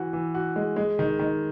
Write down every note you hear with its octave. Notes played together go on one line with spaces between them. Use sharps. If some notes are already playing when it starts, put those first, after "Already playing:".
Already playing: E3 F#4
E3
F#4
G#3
G#3
D#3
D#3